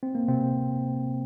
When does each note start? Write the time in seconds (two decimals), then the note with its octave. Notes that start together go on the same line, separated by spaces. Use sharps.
0.03 C4
0.15 A#3
0.28 C3 C4